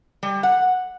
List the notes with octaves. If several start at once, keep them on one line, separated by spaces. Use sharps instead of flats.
G3
F#5